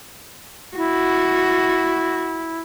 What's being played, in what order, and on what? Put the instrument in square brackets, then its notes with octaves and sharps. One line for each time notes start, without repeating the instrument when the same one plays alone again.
[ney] E4 [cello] F#4